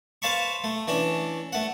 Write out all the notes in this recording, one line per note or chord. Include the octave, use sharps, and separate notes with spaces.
B4 C5 F5 A5 B5 C#6
A3
E3 C#4 D4
A3 F#5